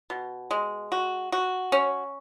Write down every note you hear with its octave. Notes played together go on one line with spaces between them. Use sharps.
B2
G#3
F#4
F#4
C#4